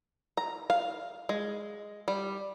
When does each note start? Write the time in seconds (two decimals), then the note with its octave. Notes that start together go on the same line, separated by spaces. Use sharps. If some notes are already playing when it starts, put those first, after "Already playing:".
0.37 A#5
0.70 F5
1.29 G#3
2.08 G3